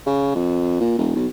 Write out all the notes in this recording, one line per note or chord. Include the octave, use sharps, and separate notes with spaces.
C#3
F2
A#2
E1
B1